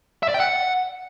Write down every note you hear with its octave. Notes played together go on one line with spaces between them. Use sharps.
E5
D5
G5
F#5